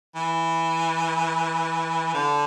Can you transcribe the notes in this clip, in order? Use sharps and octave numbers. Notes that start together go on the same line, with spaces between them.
E3
D3